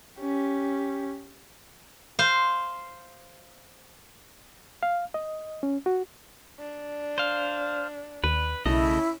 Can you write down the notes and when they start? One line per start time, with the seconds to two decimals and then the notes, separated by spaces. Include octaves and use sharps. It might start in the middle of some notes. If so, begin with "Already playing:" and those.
0.20 C#4 G4
2.19 C5 F5
4.83 F5
5.14 D#5
5.63 C#4
5.86 F#4
6.60 D4
7.18 C5 F5
8.24 D#2 B4
8.66 B1 C#3 A3 C#4 E4 D#5